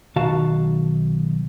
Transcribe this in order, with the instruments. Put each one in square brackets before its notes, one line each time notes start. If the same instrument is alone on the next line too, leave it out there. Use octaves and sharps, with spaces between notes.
[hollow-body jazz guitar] B1 D#3 F#4 F5 A5